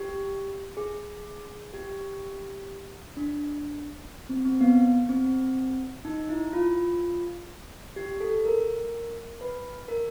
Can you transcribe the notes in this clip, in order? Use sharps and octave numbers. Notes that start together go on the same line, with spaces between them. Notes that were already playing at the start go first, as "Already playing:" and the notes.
Already playing: G4
G#4
G4
D4
C4
C4
B3
C4
D#4
E4
F4
G4
A4
A#4
B4
A#4